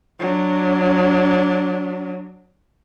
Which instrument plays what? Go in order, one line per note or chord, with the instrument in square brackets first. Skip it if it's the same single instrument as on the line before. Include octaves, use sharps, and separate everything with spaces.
[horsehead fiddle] F#3 D4